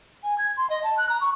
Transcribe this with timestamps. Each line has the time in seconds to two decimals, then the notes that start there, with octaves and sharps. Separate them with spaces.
0.23 G#5
0.38 G#6
0.57 C6
0.70 D#5
0.83 A5
0.97 F#6
1.09 A#5
1.21 C#6